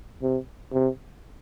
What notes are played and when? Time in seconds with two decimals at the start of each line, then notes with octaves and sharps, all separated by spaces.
0.22 C3
0.73 C3